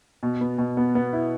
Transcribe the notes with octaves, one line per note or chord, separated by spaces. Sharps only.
B2
B3
B2
B3
B3
E4